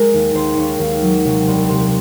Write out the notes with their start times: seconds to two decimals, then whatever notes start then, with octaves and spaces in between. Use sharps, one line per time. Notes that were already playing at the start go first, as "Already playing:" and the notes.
Already playing: G#3 A#4
0.14 D#2
0.35 D#2 C5
0.57 D#2 C#5
0.79 D#2 F5
1.02 F#3 D#5
1.25 C3 C#5
1.47 C2 C5
1.69 C3 C5